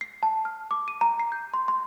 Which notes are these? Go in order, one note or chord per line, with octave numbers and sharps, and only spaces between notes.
C7
A5
F6
D6
D#7
A#5
C7
G6
C6
C6